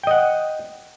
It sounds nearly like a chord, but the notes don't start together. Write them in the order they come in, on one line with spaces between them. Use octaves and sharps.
G5 D#5 F#5